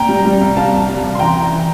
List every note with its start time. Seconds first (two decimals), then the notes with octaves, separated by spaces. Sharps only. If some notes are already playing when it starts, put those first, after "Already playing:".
Already playing: A#2 G5 A#5
0.09 G3
0.25 G3
0.41 C2
0.56 G3 F5 A5
0.72 C2
0.88 G3
1.03 C2
1.15 C6
1.19 E3 G5 A#5
1.35 E3
1.52 E3